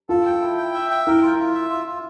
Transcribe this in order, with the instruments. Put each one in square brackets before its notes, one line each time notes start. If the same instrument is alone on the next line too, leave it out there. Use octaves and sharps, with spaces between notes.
[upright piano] F4 [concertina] A4
[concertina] G5
E4
G5
E5
G5
[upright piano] E4 [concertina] A#4
[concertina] F4
F4
E5
F4
F4